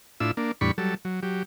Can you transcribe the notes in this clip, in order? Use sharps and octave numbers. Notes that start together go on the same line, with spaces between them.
A2 D4 E4 F4 E6
A#3 D4
E2 A2 G3 D4 B5 C#6
F#3 G3 A4
F#3
F#3 G4